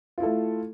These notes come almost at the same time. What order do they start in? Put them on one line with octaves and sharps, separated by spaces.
F4 E4 A4 A3